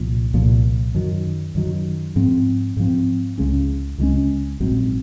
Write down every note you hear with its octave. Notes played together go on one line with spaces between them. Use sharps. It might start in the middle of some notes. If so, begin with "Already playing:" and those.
Already playing: C2 A#2 F3
C2 A#2 F3
F#2 D#3 F#3
F#2 D#3 F#3
G#2 F3 C4
G#2 F3 C4
C#2 C#3 G#3 C#4
C#2 C#3 G#3 C#4
A#1 G#2 F#3 C4